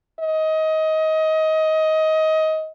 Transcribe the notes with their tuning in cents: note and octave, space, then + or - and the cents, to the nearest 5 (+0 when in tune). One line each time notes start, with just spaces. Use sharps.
D#5 +20